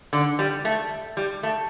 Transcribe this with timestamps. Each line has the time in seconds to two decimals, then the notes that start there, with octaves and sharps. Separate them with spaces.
0.13 D3
0.39 G3
0.65 A3
1.17 G3
1.43 A3